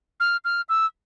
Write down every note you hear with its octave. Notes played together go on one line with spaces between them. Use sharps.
F6
F6
E6